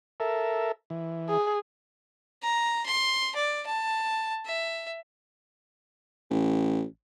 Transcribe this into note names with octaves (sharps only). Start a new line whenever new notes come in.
A4 A#4 E5
E3
G#4
A#5
C6
D5
A5
E5
A1